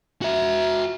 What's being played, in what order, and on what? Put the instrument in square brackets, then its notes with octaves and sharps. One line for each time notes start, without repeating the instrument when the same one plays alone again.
[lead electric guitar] F#4 E5